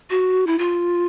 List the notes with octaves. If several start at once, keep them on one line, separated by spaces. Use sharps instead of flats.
F#4
E4
F4